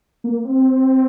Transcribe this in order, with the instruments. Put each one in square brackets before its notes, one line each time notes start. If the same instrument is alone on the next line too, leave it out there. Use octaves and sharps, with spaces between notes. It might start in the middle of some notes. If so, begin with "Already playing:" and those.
[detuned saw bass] A#3
C4